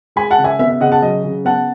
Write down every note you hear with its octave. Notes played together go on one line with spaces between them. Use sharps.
G#3 G#5 B5
F#5 A5
C#3
E5 G#5
B3 E5
E5
C#3 D#5 F#5
F#5 A5
F#3 D#5
C#3
B3 F#5 A5